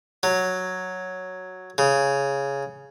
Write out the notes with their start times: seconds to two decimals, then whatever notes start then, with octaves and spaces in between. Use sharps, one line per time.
0.23 F#3
1.78 C#3